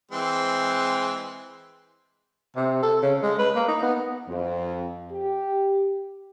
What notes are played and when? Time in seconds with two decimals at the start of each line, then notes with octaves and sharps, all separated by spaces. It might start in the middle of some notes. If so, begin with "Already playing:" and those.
0.11 E3 G#3 C4
2.56 C3
2.83 A4
3.03 C#3
3.23 G#3
3.39 B4
3.56 A#3
3.68 D#4
3.82 B3
4.28 F2
5.12 G4